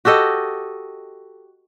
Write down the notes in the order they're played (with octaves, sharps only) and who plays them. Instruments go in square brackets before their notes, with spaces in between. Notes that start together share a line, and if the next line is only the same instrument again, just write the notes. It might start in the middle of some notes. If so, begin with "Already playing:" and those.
[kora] F#4 G4 A4 D#5